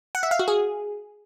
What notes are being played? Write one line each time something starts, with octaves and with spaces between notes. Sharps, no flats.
F#5
E5
F5
F#4
G#4